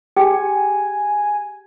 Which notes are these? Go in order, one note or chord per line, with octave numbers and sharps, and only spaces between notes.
G4 G#4 G5 G#5